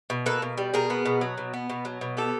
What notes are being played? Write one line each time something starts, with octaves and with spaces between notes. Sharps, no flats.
B2
A#3 A4 B4
B2
G3
B2 G#4 A#4
B3
B2
F#3
B2
B3
B2
F#3
B2
B3 G4 A4